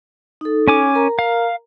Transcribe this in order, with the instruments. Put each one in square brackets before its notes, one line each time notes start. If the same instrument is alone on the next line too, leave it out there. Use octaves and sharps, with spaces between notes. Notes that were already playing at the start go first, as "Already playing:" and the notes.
[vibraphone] D#4 A4
[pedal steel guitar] C#4 G#5 D6
[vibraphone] A#4 A#5
[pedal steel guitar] F5